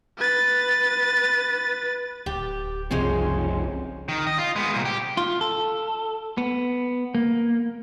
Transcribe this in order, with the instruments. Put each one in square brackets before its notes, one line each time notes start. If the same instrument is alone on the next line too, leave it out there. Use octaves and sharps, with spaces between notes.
[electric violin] B4 A6
[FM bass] D1 [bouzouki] G4
[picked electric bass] F#1 F3 C4 [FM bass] C2 [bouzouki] G#3 C#4 C5
[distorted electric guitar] D#3
D#5
F4
G#3 B3
C2 A#2
G4
[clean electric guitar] F4
A4
B3
A#3